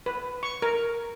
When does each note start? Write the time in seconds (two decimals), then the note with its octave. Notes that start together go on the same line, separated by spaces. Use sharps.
0.06 B4
0.43 C#6
0.62 A#4